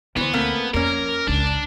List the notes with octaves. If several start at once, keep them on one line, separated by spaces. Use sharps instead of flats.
D2 E3 B3 C5
A3 A#3 C4
F2 A#3 C#4 A#4
G#1 C#2 D4